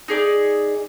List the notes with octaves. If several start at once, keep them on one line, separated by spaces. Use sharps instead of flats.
D#4 G#4 D5